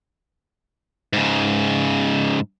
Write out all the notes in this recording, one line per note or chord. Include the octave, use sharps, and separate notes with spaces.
G#2 C#3